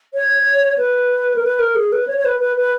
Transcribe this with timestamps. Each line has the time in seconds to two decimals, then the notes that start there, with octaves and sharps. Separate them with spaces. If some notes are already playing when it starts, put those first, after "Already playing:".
0.14 C#5
0.78 B4
1.35 A#4
1.43 B4
1.59 A#4
1.75 G#4
1.92 B4
2.07 C#5
2.17 C#5
2.24 B4
2.39 B4
2.56 B4